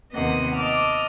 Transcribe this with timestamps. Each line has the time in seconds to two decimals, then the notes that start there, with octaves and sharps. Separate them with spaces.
0.12 D#2 C3 A#3 B3 D#5 F#5
0.55 D#5 A5 D6 E6 F6